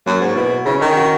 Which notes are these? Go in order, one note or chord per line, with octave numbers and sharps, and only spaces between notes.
F#2 A#3
G#2 F#4
B2 E4
C#3 E4
C#4
D#3 D#4
F#4